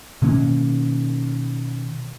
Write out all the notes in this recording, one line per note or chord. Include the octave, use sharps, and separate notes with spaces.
B2 D#3 A#3 C#4